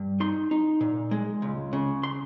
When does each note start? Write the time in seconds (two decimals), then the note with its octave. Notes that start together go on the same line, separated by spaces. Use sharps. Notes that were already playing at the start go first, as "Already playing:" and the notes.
Already playing: G2
0.20 D#4 C6
0.51 D#4
0.81 A#2
1.11 G#3
1.42 C#2
1.73 C#3
2.03 C6